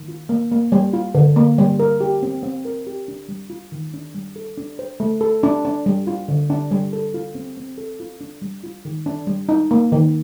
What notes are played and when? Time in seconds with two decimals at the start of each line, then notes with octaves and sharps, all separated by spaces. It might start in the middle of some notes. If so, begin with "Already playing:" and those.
Already playing: D#3
0.08 F4
0.29 A#3
0.52 A#3
0.72 G3
0.93 F4
1.15 D3
1.36 A#3
1.58 G3
1.79 A#4
2.01 G4
2.23 C4
2.43 C4
2.65 A#4
2.87 G4
3.08 D4
3.29 G3
3.50 F4
3.72 D#3
3.94 D4
4.15 G3
4.36 A4
4.58 D4
4.79 C5
5.00 A3
5.21 A4
5.43 D4
5.65 D4
5.86 G3
6.07 F4
6.28 D3
6.50 D4
6.71 G3
6.93 A4
7.14 F4
7.35 C4
7.57 C4
7.78 A4
8.00 F4
8.21 D4
8.42 G3
8.64 F4
8.85 D#3
9.06 D4
9.27 G3
9.49 D#4
9.71 A#3
9.92 D#3